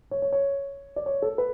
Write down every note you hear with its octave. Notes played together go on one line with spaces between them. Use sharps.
C#5
C#5
C#5
D5
C#5
A4
B4